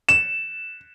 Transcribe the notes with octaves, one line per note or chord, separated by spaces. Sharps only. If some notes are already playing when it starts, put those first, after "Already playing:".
E7